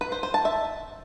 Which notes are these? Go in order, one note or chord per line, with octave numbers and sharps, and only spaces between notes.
B4
C5
C5
A5
E5